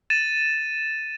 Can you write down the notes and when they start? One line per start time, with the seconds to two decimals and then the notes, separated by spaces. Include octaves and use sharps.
0.10 A6 D#7 E7